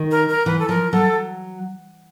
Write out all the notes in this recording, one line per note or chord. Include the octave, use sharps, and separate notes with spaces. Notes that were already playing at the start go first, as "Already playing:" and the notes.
Already playing: D#3
A#4
A#4
E3 B4
A4
F3 A#4
F#3 A4